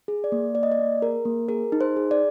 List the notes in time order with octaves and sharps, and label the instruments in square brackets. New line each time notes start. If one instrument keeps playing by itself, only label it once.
[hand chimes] G#4
D5
A#3
A#3 D5
D#5
D5
A#3
G#4 A#4
A#3
G#4 A#4
D#4
C5
G#4
D5